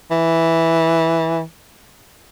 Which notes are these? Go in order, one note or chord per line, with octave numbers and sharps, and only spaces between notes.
E3